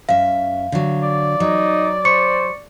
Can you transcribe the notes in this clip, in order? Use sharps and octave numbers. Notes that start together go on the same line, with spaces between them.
F#2 E5 F5
D3 F#3
D5
F#3 D#4
C5 C#6 C#7